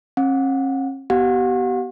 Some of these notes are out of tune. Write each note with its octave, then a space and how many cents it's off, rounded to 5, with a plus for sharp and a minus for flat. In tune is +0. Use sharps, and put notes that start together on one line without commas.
C#4 -45 F#5 -35
B3 +0 G4 -35 F#5 -40